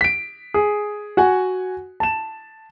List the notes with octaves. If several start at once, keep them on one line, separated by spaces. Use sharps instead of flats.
B6 D7
G#4
F#4 F#5 G#5
A5 E7